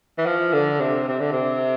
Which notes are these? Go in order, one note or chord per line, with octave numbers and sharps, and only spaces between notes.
E3
F3
D3
C3
C3
D3
C3